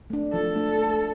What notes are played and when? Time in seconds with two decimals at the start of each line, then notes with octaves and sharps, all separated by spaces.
0.10 A3 D4
0.33 F3 A4
0.56 A3 D4
0.79 A3